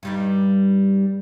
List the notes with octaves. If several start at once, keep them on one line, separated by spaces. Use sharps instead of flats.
G2 G3 D#4